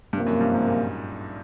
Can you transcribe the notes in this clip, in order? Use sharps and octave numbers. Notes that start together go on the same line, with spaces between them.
G2 C3 F3 A#3
F#2
G2
G#2
A#2